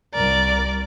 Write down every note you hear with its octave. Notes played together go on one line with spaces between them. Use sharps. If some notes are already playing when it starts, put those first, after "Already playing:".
C2 A#4 D5